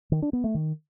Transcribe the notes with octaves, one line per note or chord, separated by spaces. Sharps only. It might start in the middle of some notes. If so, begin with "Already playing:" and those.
D#3
D4
B3
A3
D#3